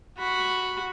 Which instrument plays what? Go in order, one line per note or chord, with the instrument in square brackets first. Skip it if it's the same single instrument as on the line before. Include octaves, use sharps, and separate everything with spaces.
[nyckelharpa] F#4 B5